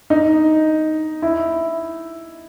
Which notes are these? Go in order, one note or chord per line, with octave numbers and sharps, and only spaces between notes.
D#4
E4